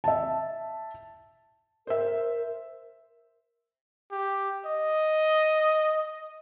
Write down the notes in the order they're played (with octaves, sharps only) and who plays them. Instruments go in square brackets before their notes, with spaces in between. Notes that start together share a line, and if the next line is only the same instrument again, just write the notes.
[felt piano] E5 A5
[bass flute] A#4 [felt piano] C5 E5
[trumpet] G4
D#5